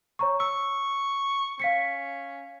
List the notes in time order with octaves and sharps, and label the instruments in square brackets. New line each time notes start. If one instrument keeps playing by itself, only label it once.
[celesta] C#5 A#5 C#6
[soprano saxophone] C#6 [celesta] E6
[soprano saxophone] C#4 [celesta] F5 B6 C#7